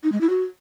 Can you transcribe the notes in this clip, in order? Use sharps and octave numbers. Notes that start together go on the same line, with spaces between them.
D#4
G#3
E4
F#4